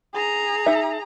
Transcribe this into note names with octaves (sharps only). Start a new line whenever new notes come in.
G#4 A#5
D#4 E5